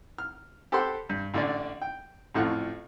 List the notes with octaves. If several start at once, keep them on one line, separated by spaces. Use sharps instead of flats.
F6
G4 A4 C5 F#5 B5 C6
G2
A1 D3 D4 D5
G5
A1 F2 A2 F4 F#5 F6